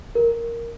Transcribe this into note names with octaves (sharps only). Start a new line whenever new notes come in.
A#4